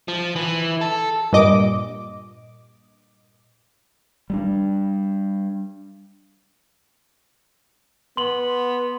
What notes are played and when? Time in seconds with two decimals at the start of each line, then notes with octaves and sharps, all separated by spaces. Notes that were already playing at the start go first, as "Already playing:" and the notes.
0.08 F3
0.36 E3
0.81 A4
1.33 G2 A#2 D#5 D6
4.30 G3 G#3 D4
8.17 B3 C6 F#7